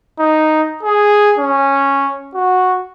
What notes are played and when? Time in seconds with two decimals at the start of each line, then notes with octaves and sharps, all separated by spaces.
0.20 D#4
0.83 G#4
1.39 C#4
2.35 F#4